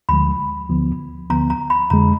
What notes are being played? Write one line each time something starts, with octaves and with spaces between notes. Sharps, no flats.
D2 D3 F3 G#3 B5
D2 D3 F3 B3
D2 D3 F3 B3 A#5
A#5
B5
F2 D3 G#3 A#5